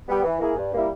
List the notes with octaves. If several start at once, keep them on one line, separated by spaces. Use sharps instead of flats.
G3 B3 G4
E3
A#3 E4 G#4
G2
G3 A#3 E4